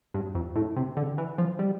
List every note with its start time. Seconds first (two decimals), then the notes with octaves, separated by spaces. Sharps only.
0.14 G2
0.35 F2
0.56 A2
0.76 C3
0.97 D3
1.18 E3
1.38 F3
1.59 G3